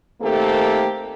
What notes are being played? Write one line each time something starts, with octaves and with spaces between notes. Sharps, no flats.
D#3 A3 A#3 C4 G4 A4